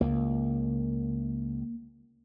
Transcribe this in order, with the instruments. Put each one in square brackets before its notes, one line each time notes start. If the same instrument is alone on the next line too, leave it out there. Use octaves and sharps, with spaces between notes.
[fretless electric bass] C#2 [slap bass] A#3